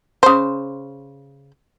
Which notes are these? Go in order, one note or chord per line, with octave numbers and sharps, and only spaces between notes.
C#3 C5